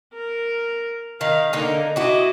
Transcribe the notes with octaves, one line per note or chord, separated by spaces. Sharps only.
A#4
D#3 F5
D3 A#3 D#4
E4 F#4 D#5 D6